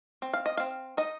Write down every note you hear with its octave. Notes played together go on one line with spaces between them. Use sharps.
C4
F5
D#5
C4 F5
D#4 D#5